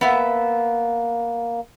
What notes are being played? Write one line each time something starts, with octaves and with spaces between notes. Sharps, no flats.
A#3 B3 E5